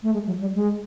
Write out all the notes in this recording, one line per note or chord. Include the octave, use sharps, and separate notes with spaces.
A3
G#3
F#3
G3
G#3